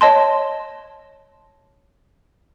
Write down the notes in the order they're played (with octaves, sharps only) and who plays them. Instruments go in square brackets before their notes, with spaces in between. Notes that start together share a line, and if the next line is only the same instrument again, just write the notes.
[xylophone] C#5 D#5 A5 C6